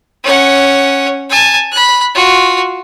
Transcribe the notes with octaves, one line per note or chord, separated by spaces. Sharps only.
C#4 F#5
G#5 A5
B5 F#6
F4 F#4